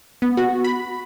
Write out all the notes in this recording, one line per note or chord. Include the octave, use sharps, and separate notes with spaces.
B3
F#4
B5